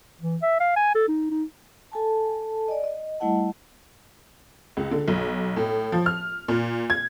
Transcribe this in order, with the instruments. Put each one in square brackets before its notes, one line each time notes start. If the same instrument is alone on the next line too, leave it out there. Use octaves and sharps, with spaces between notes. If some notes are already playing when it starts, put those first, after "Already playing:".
[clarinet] E3
E5
F5
G#5
A4
D#4
D#4
[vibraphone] A4 G#5 A5
D5 D#5
D#5
G3 A3 E4 D#5 F#5 A5
[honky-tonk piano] C#2
D3
B1
A2
F3
F6
A#2
G#6